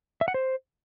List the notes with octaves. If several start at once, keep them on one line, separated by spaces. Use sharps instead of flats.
E5
F#5
C5